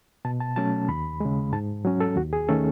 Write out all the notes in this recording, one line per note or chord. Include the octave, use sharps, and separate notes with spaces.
B2 A5
A5
F#3 A3 C#4 A5
D#2 B5
C#3 G#3
G#2 A5
F#3 C#4
A4
D#2 F#4
G#4
D#3 A3 C#4 A4